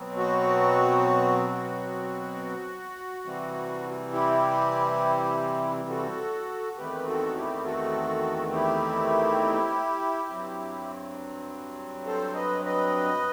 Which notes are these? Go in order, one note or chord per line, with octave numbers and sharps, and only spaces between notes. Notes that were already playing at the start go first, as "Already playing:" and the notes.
Already playing: B2 F#3 C4
F#4
F#4
C3 E3 G3 C4
E4 G4
F#4 A4
E2 D#3 A3 C4 G4 B4
F#4 A4
E4 G4
F#4 A4
E4 G4
G2 F#3 C4
A4 C5
B4 D#5
B4 D#5